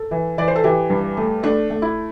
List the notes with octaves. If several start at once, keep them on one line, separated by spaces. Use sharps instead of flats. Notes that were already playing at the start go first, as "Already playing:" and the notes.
Already playing: A4
E3
E3 D5
C5
A4
E3 G4
G2
A3
A3 D4
A3
E4